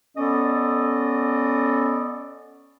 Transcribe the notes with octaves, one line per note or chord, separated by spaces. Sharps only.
B3 C#4 A4 D5 D#5